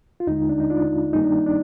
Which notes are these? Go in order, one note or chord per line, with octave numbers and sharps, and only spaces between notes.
F4
D#2 D3 G#3 D#4
D4
D#4
D4 F4
G2 D#3 G3 A#3 D#4
D4
D4